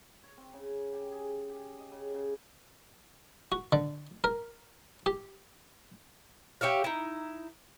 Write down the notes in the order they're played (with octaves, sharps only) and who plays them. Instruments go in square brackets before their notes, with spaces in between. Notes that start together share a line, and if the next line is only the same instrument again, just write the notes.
[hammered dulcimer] C#5
C4
C#3
G4
G#4
G4
D#5
C#3
C#3
[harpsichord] F#4
D3
A#4
G4
[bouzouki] G4 C#5 E5 F5
D#4 E4